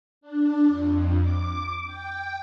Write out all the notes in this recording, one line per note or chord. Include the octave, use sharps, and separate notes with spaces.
D4
F2
D6
G5